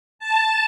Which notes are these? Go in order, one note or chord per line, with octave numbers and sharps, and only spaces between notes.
A5